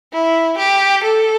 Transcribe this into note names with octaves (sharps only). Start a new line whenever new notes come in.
E4
G4
A4